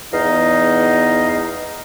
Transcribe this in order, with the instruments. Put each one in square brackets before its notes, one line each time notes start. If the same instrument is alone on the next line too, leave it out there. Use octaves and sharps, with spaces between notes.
[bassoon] E2 [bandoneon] D#4 D#5 F5